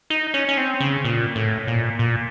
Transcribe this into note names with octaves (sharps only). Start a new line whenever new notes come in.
D#4
C#4
C#4
C4
C#3
A#2
A2
A#2
A#2